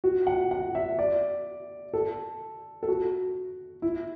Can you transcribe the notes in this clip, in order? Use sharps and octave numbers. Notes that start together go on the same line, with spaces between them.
F#4
F#5
F#5
E5
D5
A4
A4
F#4
E4